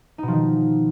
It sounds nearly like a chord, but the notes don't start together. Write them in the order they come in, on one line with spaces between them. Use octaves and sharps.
D#4 B2 F3 D#3